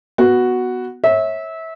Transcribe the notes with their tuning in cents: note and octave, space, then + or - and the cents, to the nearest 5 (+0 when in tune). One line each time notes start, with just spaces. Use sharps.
B3 +0 F#4 +0
C#5 -25 E5 -25